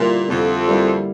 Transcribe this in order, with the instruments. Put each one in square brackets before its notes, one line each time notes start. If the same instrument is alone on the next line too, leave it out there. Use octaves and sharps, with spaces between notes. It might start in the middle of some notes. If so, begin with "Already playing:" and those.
Already playing: [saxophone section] A#2 [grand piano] D3 G3 A#3 E4
[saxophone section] F2 [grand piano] D3
[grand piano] G3 A#3 E4